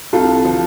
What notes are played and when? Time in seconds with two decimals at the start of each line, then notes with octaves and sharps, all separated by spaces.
0.13 C2 F4 A4
0.45 F3